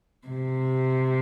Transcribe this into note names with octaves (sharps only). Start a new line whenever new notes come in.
C3